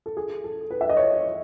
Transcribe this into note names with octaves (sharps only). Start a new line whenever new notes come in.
A4
G#4
A4
B4
E5
D#5
C#5